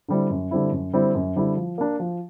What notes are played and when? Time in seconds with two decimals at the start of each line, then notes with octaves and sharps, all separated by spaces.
0.08 D3 G3 C4 E4
0.30 F#2
0.51 D3 G3 C4 E4
0.72 F#2
0.93 D3 G3 C4 E4
1.15 F#2
1.36 D3 G3 C4 E4
1.57 F3
1.78 A#3 D4
2.00 F3